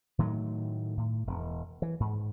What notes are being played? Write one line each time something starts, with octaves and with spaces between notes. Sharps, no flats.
A2 D#3 F#3 A3
A2
E1
E3
G#2